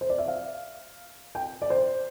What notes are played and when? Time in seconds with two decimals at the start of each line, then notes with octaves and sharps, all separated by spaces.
0.01 C5
0.10 D5
0.18 E5
0.28 F5
1.35 G5
1.62 D5
1.70 C5